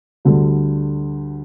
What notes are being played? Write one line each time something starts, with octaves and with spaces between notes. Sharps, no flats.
D2 D3 G3